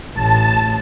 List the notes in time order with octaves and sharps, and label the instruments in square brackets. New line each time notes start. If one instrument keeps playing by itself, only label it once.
[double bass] A1 A2 [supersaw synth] A5